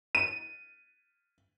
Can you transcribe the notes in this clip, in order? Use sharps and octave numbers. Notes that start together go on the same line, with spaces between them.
D#7